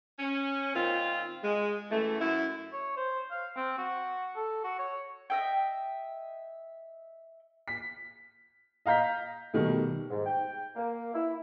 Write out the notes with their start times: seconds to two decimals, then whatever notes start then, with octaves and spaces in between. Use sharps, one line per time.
0.19 C#4
0.75 A#2 D#3 C4 F4
1.43 G#3
1.90 F#2 E3 A3
2.20 F#2 E4
2.73 C#5
2.97 C5
3.31 F5
3.56 C4
3.78 F#4
4.36 A4
4.64 F#4
4.79 C#5
5.30 D#5 E5 G5
7.68 B6
8.86 D#5 F5 A#5 G6 B6
9.54 B2 D#3 G3 A3
10.10 G#2
10.26 G5
10.76 A#3
11.14 E4